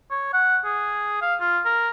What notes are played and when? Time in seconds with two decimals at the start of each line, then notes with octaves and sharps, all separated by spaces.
0.11 C#5
0.33 F#5
0.65 G#4
1.22 F5
1.40 F4
1.65 A#4